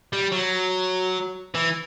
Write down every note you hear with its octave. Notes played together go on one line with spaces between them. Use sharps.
G3
F#3
E3